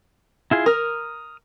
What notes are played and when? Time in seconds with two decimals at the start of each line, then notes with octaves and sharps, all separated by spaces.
0.51 E4 F4 G#4
0.66 A#4 D#6 F6